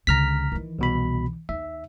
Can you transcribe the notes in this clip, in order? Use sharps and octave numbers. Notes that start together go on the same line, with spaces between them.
C#2 D3 A#5 F6 B6
D#3 E3
C2 B2 B5
D#2 E5